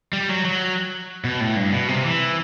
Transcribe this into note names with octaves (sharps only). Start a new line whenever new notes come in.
G3
F#3
F#3
B2
A2
G2
B2
C3
E3